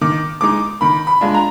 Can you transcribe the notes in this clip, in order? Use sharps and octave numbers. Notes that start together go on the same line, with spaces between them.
D#3 D6
G#3 D#4 D6
D#3 B5
B5
G#3 D4 F4
A#5